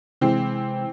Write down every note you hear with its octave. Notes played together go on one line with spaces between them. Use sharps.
C3 E3 G#3 C4